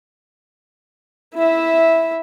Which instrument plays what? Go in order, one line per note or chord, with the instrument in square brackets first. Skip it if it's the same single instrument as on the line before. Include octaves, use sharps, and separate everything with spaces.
[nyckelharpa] E4 E5